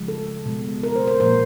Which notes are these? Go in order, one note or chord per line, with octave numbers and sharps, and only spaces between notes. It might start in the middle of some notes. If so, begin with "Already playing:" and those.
Already playing: C#3 F3 G#3
A4
B2 G#3
A#4
C5
C5
A#2 F3 A#3 C5